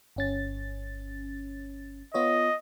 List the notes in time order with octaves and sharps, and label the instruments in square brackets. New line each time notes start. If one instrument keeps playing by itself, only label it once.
[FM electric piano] G1 C#4 A6
[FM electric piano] B3 F4 C#5 [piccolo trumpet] D#5